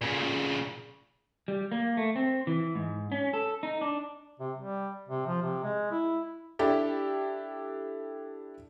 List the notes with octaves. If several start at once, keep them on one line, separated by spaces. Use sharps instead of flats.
A#2 C#3
G3
A#3
A3
C4
E3
G#2
C#4
A4
D#4
D4
C3
G3
C3
F3
C3
G#3
E4
D4 E4 G4 A4